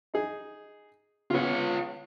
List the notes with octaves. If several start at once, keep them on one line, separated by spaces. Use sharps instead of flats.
D#4 G#4
C#3 B3 F4 C#5